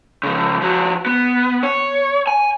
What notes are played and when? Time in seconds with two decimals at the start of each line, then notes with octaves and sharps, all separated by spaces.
0.23 C#3 F3
0.61 F3 F#4
1.06 B3
1.63 C#5
2.27 G#5